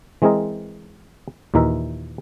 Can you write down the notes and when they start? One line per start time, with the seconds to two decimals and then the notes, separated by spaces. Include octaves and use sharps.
0.22 E3 G#3 C4 G#4 A#4 D#5
1.54 D#2 A#2 E3 D#4 A#4 E5